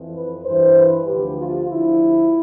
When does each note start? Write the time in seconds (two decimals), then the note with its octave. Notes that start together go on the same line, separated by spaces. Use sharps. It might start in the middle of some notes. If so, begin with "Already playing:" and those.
Already playing: F2 E3
0.14 B4
0.45 G2 E3 C5
0.76 B4
1.07 D2 D3 F3 G4
1.38 F4
1.69 D2 D3 F3 E4